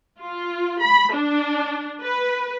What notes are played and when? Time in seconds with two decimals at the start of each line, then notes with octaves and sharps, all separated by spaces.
0.20 F4
0.82 B5
1.14 D4
2.02 B4